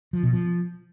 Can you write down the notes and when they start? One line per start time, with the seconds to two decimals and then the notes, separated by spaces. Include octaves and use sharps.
0.13 F3
0.23 B2
0.33 F3